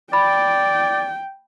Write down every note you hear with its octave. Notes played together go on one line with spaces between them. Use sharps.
D5 G5 B5